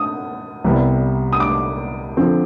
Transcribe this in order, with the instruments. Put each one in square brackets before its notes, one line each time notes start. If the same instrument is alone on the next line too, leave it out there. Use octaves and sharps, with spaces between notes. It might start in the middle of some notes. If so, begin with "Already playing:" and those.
Already playing: [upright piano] D#6
[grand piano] C2 C3 G3 B3
[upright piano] D#6
D6
[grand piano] D3 F3 C4